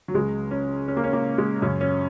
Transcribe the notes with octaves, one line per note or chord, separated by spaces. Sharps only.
F#3
C#2 C#3 G#3
C#4
C#4
A#3
C#4
A#3
G#3
F#2 C#3 C#4
C#4